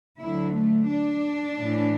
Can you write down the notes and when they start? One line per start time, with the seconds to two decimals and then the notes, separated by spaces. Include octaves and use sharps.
0.20 D2 D3 F#3 E4
0.54 A3
0.89 D4
1.59 A2 E3